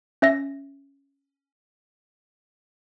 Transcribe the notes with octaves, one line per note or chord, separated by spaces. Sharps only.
C#4 E5 A#6